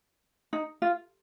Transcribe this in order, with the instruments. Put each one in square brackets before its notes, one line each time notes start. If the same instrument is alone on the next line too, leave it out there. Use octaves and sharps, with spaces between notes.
[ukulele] D#4
F4